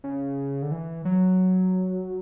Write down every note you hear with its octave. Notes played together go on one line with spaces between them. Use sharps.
C#3
D3
E3
F#3